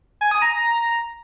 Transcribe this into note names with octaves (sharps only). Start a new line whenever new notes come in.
G#5
D#6
A#5